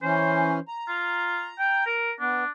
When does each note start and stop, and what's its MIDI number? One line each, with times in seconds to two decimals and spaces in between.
0.02 0.59 52
0.02 0.59 61
0.02 0.60 72
0.68 1.96 82
0.88 1.48 65
1.58 1.86 79
1.86 2.12 70
2.20 2.44 59
2.20 2.50 62